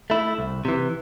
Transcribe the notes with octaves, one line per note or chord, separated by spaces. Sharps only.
A3 E4
C2
C3 E3